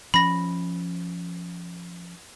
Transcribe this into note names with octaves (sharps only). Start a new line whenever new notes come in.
F3 C#4 B5 A#6